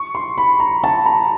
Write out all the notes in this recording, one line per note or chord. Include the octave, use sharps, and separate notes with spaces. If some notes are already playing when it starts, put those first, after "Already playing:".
Already playing: C#6
C6
B5
A#5
A5
A#5